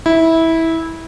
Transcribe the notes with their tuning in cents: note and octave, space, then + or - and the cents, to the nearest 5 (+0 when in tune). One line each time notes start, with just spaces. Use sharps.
E4 -15